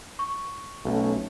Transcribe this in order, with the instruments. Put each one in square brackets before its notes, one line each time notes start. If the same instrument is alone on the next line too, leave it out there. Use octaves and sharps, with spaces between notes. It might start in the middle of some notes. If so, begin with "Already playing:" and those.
[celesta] C#6
[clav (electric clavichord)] B1 [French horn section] F#3 A3 C#4